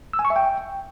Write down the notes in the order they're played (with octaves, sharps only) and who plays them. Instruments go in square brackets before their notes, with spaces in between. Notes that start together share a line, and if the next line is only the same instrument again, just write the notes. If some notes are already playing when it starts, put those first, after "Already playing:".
[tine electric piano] E6
G#5
C#6
E5
G5